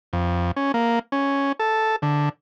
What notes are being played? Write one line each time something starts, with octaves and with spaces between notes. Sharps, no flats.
F2
C#4
A#3
C#4
A4
D3